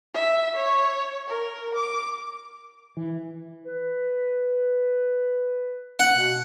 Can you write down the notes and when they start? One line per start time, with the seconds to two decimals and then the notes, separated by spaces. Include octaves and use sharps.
0.14 E5
0.55 C#5
1.27 A#4
1.75 D6
2.97 E3
3.65 B4
5.99 F#5
6.13 B2